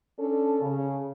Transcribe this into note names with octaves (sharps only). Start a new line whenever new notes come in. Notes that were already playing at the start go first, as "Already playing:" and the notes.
C#4 D4 A4
C#3